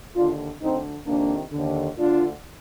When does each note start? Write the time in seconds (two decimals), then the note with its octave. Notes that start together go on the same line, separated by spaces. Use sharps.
0.15 D#2 D3 D4 F4
0.60 D2 D3 C4 D#4
1.06 F2 C3 D#3 A#3 D4
1.51 D#2 D3
1.97 D2 D3 D4 F4